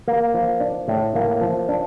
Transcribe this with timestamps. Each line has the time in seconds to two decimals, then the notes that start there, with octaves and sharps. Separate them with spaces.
0.08 A#3
0.34 F3
0.60 D4
0.88 A2
1.15 A#3
1.41 F3
1.69 D4